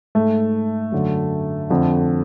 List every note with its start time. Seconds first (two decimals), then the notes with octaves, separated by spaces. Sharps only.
0.15 G#2 A3
0.92 F#2 D3
1.70 F2 D3